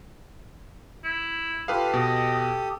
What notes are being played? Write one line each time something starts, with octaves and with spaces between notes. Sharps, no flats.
E4
F4 G4 A4 B4 F5 D#6
B2 D#5